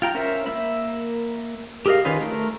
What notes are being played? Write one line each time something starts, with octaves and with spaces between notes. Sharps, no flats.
F4 G5 A#5
C#4 A#4 C5 E5
A#3 E5 B5
G4 G#4 A#4 D#5 F5
D#3 C#4 D#4 F4 B4
A3 A#4